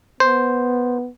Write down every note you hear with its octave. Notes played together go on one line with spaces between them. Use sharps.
B3 C5